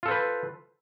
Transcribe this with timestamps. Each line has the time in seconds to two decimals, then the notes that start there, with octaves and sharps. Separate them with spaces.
0.03 F4
0.06 A4
0.08 C5
0.11 B4